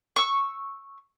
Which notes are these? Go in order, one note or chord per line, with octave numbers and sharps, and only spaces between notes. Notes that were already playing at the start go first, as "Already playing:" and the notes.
C#6 E6